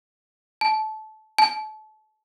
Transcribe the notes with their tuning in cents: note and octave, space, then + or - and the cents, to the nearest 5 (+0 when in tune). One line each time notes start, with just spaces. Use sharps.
A5 -20
A5 -30